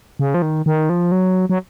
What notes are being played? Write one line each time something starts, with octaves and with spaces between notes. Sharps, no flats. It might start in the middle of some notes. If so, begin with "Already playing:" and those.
C#3
F3
D#3
D#3
F3
F#3
F#3